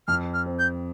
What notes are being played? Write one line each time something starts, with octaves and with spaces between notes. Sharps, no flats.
F2 F6
F6
C4
G6